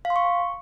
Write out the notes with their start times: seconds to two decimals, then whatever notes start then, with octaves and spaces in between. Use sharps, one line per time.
0.05 F5
0.10 C6
0.16 C#6